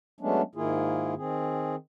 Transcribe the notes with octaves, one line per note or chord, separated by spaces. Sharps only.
F#3 G#3 A3 B3 C#4 D4
G#2 D#3 A#3 E4 F4 G#4
D#3 C4 G#4